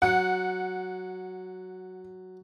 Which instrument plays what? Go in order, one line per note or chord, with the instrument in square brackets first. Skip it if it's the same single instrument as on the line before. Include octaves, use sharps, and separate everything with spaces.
[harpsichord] F#3 [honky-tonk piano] F#5